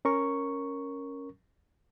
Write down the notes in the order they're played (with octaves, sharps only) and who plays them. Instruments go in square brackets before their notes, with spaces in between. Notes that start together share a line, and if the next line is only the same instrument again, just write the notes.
[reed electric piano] C#4 A#4 C#6